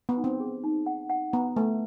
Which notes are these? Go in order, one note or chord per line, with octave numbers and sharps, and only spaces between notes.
B3
D#4
C4
G#4
D#4
F#5
F#5
B3 A#5
A3 B4